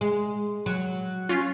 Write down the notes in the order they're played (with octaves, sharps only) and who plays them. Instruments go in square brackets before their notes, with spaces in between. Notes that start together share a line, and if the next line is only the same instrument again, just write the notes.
[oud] G#3
F#3
[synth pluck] C#4 F4